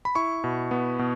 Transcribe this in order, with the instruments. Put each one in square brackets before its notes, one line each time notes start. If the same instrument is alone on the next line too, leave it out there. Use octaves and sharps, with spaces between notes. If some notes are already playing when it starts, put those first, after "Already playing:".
[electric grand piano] B5
E4 C#6
B2
B3
B2